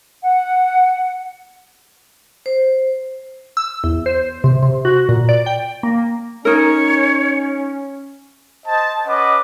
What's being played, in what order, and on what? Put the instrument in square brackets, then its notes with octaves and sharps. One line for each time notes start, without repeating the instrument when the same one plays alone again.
[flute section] F#5
[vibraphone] C5
[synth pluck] E6
E2
C5
C3
C3
F#4
A#2
D5
G5
A#3
[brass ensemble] C#4 [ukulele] D#4 A#4 [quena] C#5
[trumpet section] C5 D#5 A5
C#4 B4 C#5 D#5 F#5 D6